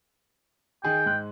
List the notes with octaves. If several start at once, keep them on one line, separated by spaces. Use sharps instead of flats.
D#3 G#4 G5 G#5
G#2 G#3 F#6